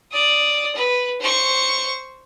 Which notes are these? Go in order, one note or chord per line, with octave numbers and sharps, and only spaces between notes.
D5 D#6
B4
C5 C#6